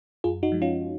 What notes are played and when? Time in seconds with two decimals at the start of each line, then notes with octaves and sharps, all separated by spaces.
0.24 F#2 F4 G#4
0.43 D#4 F#4
0.52 F3 G#3
0.62 C#4 F4